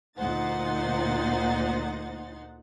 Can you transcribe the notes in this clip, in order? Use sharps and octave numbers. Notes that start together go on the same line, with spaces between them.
D2 A#2 D#4 C5 F#5 A6